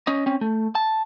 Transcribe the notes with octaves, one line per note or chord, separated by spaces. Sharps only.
C#4 D#5
C4 C#4
A3
A5